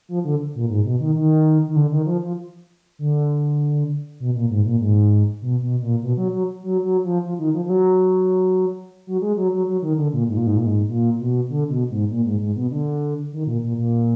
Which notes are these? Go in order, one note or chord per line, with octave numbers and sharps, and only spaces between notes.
F3
D3
A#2
G#2
B2
D#3
D#3
D#3
D3
D#3
F3
F3
D3
B2
A#2
G#2
A#2
G#2
B2
B2
A#2
B2
F#3
F#3
F#3
F#3
F3
F3
D#3
F3
F3
F#3
F#3
G#3
F#3
F#3
F#3
D#3
D3
A#2
G#2
A#2
G#2
A#2
G#2
A#2
B2
D3
B2
G#2
A#2
G#2
G#2
B2
D3
D#3
A#2
A#2
A#2